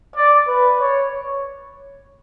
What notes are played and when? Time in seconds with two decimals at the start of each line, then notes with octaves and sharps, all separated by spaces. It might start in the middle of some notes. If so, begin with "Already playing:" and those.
0.16 D5
0.47 B4
0.80 C#5